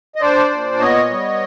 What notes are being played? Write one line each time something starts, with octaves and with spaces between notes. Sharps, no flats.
D#5
D4 C5 D5
A#2
B3 C#5 D#5
G3